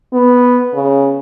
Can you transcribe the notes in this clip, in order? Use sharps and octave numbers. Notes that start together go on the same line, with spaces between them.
B3
C#3